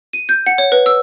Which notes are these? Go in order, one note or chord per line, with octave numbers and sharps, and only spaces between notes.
D#7
G6
F#5
C#5
B4
E6